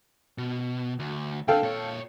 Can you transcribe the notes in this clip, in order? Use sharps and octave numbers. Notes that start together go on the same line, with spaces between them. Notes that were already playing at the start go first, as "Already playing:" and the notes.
B2
D2
C#3 D4 A4 F5 G5
A#2 C#5